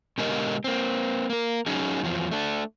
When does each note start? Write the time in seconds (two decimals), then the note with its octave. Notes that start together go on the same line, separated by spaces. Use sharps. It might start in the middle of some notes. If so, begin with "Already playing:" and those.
0.18 B2 D3 G#3 G4 A#4 D#5
0.64 A#3 C4
1.30 A#3 A#4
1.66 F#3 C#4 D#4 G#4
2.04 E2 F3 F#3
2.31 A3 D4